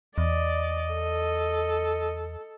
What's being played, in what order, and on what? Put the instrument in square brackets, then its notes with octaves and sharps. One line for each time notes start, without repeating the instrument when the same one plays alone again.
[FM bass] E2 [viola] D5 [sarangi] D#5
[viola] A4